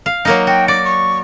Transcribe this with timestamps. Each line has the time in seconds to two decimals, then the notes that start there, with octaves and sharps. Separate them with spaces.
0.06 F5
0.25 F#3 A#3 D#4
0.47 F#4 G5
0.68 D5 D6
0.85 C#6